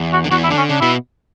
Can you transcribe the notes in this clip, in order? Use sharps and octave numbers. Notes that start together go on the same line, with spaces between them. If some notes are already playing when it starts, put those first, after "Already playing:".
Already playing: E2
F#4
D3
E2 E3 F#4
E4
D3 D4
C#4
C#3 D4
B2 B3 E4